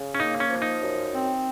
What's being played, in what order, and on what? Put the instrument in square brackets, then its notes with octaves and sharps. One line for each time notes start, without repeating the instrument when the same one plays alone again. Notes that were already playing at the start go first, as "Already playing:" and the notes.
Already playing: [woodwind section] C#3
[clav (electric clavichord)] C#4
[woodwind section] A#3 [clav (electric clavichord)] D#4
[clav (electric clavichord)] C#4
[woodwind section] F3
[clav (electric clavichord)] D#4
[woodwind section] F#2
C4